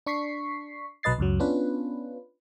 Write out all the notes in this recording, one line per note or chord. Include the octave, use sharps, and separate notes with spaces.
D4 C#6 B6 C7
B1 F#3 B4 D#5 A6 C7
C#2 F#2 F#3
B3 C#4 D4 F4 B4